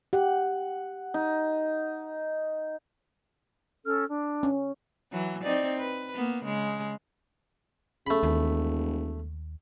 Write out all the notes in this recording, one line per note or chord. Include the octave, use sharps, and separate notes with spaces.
G4 F#5
D#4
C#4 A4 F6
D4
C#4
E3 F#3
C4 D#4 D5
B4
A#3 B3
C#3 G#3
C#3 A3 B5
E1 D#2